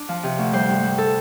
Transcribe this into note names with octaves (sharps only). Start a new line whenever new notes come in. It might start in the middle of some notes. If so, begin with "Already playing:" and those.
Already playing: D4 D5
F3
C3
D2
G3 C5
G2
G3
A4